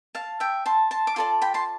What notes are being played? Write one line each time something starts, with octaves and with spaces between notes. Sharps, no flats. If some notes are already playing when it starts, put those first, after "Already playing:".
F5 A5
E5 G5
A5 C6
A5 C6
D6
F4 A4 D5 A5 C6
G5 B5
A5 C6